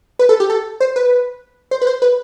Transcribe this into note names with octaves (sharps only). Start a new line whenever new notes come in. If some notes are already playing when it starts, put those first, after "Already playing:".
B4
A4
G4
A4
C5
B4
C5
B4
C5
B4